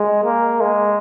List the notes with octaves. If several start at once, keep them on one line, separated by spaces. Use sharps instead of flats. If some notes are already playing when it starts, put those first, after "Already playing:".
Already playing: G#3
A#3
G#3